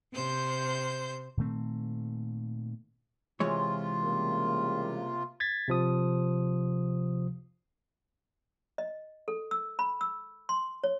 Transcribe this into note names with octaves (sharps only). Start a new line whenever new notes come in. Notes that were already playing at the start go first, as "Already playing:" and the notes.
C3 C5 G6
A#2 D#3 A3 C4
C3 E3 G#3 F4 C#5
C#3 G3 A#3
G#6 A6 B6
C3 F3 D#6
D#5
A4
E6
B5
E6
C6
C#5